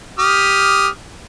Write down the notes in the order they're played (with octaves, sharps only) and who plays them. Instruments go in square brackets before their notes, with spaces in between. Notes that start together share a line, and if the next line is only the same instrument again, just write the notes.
[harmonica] G4 D#6 F6